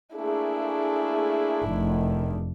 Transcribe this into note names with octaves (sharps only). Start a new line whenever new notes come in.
A3 A#3 D4 E4 G#4
F1 E2 D#3